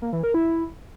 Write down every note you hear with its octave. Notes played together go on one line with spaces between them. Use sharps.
A#3
E3
A#4
E4